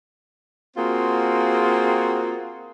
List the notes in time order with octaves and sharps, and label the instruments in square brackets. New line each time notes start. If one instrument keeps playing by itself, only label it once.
[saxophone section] A#3 C4 F4 F#4 G#4